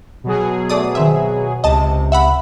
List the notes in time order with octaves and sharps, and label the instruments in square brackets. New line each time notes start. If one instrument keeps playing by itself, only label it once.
[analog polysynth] B2 F#3 G#4
[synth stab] A3 D5 D#6
D#3 C4 E5
[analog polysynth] C#2 C3 [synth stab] D#5 A5
[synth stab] E5 F#5 B5